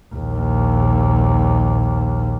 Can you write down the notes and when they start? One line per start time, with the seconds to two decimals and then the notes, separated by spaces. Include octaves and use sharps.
0.14 A#1 D#2